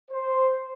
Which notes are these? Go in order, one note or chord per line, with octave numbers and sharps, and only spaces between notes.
C5